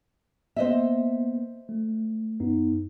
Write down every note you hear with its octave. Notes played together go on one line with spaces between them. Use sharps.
A#3 B3 C5 D#5 E5
A3
F#2 B3 D#4